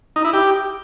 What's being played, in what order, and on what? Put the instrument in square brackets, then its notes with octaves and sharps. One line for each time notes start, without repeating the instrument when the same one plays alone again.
[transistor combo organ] D#4
E4
G4